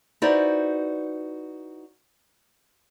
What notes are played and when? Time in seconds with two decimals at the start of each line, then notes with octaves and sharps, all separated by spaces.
0.22 D#4 E4 F#4 B4 C5 D5